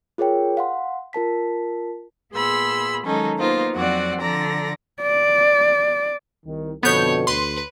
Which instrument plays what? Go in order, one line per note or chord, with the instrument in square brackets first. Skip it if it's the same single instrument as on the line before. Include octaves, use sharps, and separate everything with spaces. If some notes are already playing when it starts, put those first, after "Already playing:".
[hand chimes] F4 G#4 A#4 C#5 G5
F5 F#5 C6
F4 A#4 A5 B6
[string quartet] A#2 B3 G#4 B5 C6 E6
D#3 F#3 G#3 C#4 D#4 A4
A#3 B3 D#4 F4 C5
F2 F#3 C4 F#4 D5 F#5
D3 F3 D5 A#5 A#6
[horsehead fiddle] D5
[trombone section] C2 D#3
[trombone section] F2 D3 A4 [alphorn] B2 [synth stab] B3 G6 [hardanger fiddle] C#5
[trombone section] D2 [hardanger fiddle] B4 [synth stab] C6